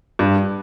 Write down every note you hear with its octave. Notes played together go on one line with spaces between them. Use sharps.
G2